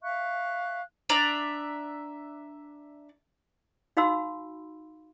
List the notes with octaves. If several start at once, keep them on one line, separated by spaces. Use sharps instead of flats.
E5 F5 C#6 F#6
D4 D5 E5 A#5
D#4 F#4 F5 B5 C6 E6